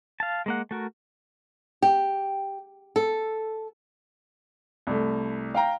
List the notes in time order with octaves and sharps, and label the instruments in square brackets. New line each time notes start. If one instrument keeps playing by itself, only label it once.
[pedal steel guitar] F5 A5
G#3 A#3 F#5
A3 F#4 A#4
[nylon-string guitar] G4
A4
[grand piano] C2 A3
F5 G5 A#5